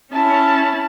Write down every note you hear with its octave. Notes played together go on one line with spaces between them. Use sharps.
C#4 E4 A5